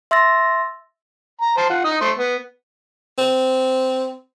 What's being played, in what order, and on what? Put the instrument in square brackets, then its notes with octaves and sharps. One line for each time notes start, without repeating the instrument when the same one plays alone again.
[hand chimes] E5 C6 E6 A6 A#6
[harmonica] A#5
C5 A5
F4 F#5
D#4 D#6
A3 C5 C6
B3
[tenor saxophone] C4